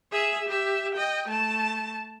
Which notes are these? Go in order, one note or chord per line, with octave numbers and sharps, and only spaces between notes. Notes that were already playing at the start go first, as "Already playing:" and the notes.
G#4 E5
G4 E5
D#5 G5
A3 A5